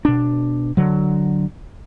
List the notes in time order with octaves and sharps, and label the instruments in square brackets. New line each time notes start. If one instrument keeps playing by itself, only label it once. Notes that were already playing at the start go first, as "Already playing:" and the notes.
[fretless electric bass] B2 D4
D3 F#3